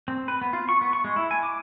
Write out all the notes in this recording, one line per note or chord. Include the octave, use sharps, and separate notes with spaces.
C4
B4
B3
F4
C#6
B3
C#6
G#3
E4
G#5
D6